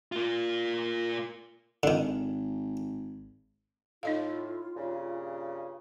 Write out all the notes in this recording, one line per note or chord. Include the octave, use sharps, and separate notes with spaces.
A#3 F4
G#1 D3 D#3
A2 D#4 F4 D#5 F5
G2 A#2 C#3